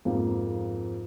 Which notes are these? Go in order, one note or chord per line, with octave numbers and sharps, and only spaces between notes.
F2 G#2 F3 A#3